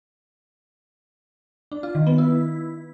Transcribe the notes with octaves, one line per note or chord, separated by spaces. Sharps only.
D4
F4
D#3
B3
E4